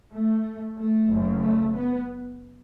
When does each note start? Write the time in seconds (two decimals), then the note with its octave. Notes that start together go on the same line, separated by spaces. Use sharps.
0.12 A3
0.77 A3
1.09 F#1 F#2 C#3
1.41 A3
1.75 B3